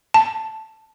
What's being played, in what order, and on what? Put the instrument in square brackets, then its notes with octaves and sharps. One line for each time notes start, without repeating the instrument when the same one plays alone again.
[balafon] A5